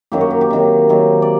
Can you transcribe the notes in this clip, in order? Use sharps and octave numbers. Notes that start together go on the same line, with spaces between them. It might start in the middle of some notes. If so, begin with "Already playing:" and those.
F#2 D#3 F#3 A#3 G4
F#4
G4
G4
C3 D#3 F#3
C3 D#3 F#3
D5